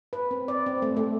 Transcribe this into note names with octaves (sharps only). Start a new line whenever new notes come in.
B4
C4
D5
C4
A3
A3